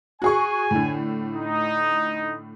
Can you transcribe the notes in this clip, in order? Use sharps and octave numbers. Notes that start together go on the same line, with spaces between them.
F#4 G#4 G#5 C#6
A2 D3
D#4